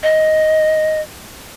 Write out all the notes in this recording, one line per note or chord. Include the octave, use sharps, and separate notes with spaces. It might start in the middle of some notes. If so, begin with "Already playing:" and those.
D#5